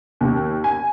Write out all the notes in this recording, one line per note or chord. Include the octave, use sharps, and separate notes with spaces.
D#2
G#5